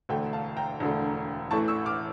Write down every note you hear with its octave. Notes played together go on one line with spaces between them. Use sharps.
E1 D2 D3 A3 G5
F5 A5
G5 A#5
E1 D2 D3 A3
A1 A2 E3 A3 A5 C#6
C#6 E6
D6 F6